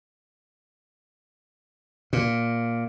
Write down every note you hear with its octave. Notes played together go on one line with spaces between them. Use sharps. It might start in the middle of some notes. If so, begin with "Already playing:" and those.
A#2